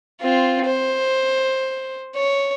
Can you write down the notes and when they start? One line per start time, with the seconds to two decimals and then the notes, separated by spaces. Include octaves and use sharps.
0.21 C4 F4
0.66 C5
2.15 C#5